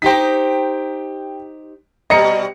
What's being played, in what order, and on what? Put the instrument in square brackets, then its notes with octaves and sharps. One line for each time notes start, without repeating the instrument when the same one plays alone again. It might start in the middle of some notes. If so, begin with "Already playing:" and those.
[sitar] D#4 G4 C5 [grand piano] G5 B6
[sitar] B2 G3 [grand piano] D#5 A#5 C#7